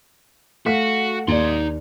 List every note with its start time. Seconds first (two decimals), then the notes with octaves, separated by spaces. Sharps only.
0.66 A3 F#4 F5 B6
1.28 D#2 D#4 D5 C6